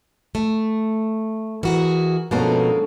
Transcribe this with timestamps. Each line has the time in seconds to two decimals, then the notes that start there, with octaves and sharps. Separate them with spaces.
0.35 A3
1.63 E3 F#4 G#4 A#4
2.31 B2 D3 F3 G#3 A#3 C#4 D#4 A5